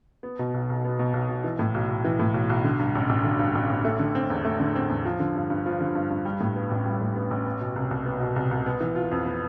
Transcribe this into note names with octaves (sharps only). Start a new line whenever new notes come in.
B3
B2
B1
B1
B3
B2
B1
B1
E3
A2
B1
B1
E3
A2
B1
B1
D3
G2
A1
A1
D3
G2
A1
A1
A3
D3
C4
E2
A3
D3
C4
E2
F3
D3
G2
G2
F3
D3
G2
G2
G3
A2
B3
A1
G3
A2
B3
A1
B3
B2
C2
C2
B3
B2
C2
C2
B3
E3
F4
F2
B3